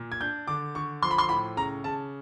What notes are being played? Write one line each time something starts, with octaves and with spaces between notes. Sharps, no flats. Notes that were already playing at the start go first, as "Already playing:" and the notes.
Already playing: A#2
G#6
D4 G6
D3 D6
D3 C#6
F3 C6
B5
C6
A2 B5
C#3 A#5
C#3 A5